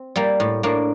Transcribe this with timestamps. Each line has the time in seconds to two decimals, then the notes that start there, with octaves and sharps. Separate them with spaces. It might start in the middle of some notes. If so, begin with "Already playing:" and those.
Already playing: C4
0.16 G3 A#3
0.40 A2
0.63 A2 A#3 D4